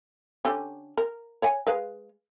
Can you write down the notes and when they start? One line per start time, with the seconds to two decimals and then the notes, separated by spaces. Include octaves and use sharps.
0.45 D3 C#4 G4
0.97 A#4
1.42 C#5 F#5 G#5
1.67 G#3 B4 F5